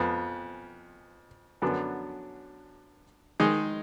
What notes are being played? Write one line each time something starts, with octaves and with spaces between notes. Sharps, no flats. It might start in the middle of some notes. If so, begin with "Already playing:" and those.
Already playing: F2 F3 B3
F#2 D3 F#3 B3 D4
D#3 G#3 D#4